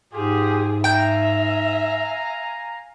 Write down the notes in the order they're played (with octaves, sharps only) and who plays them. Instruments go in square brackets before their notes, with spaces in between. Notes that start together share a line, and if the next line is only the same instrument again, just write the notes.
[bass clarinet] G#2 [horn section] F4 G4 [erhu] G#4
[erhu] E5 [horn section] F5 G#5 A#5 [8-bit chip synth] G5 G6